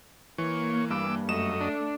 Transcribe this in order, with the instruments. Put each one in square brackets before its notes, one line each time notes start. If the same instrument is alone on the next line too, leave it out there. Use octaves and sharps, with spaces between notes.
[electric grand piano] E3 [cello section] A#3 [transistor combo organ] C#5
[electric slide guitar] G2 [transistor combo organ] D6 E6
[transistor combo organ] F#2 D#5 [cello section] A3 [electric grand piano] E7
[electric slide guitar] D4